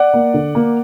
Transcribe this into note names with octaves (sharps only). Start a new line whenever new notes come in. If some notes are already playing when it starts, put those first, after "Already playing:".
Already playing: D5 F#5
A#3
D3
A#3